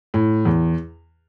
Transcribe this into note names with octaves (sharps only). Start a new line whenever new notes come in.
A2
E2